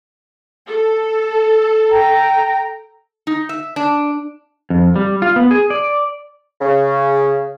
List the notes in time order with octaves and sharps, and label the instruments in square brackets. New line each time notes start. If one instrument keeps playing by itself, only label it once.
[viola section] A4
[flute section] G5 A#5
[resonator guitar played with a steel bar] D#4
E5
D4
[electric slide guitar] F2
G3
F4
B3
G#4
D5
[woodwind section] C#3